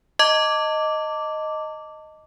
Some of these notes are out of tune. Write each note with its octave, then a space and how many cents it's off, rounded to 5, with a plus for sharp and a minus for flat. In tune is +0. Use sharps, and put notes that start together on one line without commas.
D#5 +0 A5 +40 D6 -10